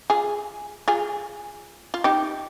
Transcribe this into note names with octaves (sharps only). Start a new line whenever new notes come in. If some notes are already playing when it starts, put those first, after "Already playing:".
F4 G#4
F4 G#4
F4
D#4 G4